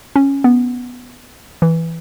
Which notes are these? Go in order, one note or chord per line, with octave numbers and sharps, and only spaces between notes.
C#4
B3
E3